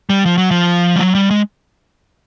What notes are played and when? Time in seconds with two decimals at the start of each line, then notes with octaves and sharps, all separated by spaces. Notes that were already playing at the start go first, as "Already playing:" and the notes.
0.10 G3
0.26 F3
0.38 F#3
0.51 F3
0.96 G3
1.01 F#3
1.15 G3
1.30 G#3